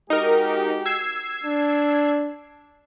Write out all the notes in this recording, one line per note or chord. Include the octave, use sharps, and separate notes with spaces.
G#3 D#4 F#4 G4 A#4
E6 G#6 C7
D4